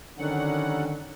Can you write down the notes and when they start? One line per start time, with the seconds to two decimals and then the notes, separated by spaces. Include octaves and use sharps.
0.18 D3 D#3 F#3 G3 C#4 F#5